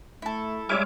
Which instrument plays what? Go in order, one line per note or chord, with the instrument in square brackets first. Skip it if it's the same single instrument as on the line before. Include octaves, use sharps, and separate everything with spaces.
[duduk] A3 [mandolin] E4 A4
[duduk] G3 [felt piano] G#3 C#5 F6 [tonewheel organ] E5 G#5 D6